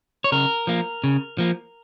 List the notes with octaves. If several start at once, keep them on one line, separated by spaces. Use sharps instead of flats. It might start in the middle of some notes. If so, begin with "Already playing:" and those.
C#5
C#3 A#4
F3 A#3
C#3
F3 A#3